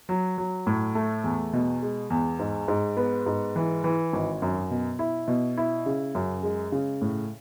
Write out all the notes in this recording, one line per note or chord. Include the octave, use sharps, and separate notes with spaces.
F#3
F#3
A2
A3
E2
B2
G#3
E2
G#2
G#2
B3
G#2
E3
E3
G#1
F#2
B2
E4
B2
E4
C#3
F#2
G#3
C#3
A2